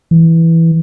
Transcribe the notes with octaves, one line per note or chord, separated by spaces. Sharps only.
E3